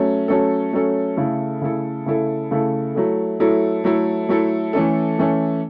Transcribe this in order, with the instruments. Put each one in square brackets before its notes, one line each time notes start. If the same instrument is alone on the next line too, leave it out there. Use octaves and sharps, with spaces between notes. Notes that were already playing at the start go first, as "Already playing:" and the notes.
Already playing: [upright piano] F#3 A3 C#4
F#3 A3 C#4 A4
F#3 A3 C#4 A4
C#3 A3 E4 A4
C#3 A3 E4 A4
C#3 A3 E4 A4
C#3 A3 E4 A4
F#3 A3 E4 A4
F#3 A3 E4 A4
F#3 A3 E4 A4
F#3 A3 E4 A4
E3 A3 C#4 A4
E3 A3 C#4 A4